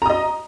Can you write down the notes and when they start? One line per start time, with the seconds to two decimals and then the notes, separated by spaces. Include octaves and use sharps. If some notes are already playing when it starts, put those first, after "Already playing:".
0.02 A#5
0.06 D#6
0.10 D#5